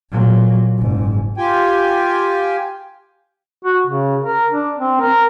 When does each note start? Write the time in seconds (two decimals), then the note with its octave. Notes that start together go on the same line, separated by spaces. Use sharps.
0.11 A#2 F#3
0.78 F#1 G#2
1.37 F4 G4 G5 G#5
3.65 F#4
3.87 C#3
4.24 A#4
4.52 D4
4.78 C4
5.01 A#4